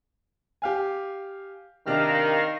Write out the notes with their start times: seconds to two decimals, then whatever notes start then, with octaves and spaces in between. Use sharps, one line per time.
0.62 G4 F5 G#5
1.87 C3 D#3 D4 G4 F5 F6 A#6